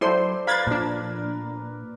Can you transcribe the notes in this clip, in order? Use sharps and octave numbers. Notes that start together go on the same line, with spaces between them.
F#3 E4 A4 C5 D5 C6
A#4 B4 F5 B5 G#6 A6
A#2 F3 D4